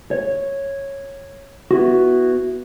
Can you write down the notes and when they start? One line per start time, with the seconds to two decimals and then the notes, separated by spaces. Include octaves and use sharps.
0.11 C#5
1.71 B3 E4 F#4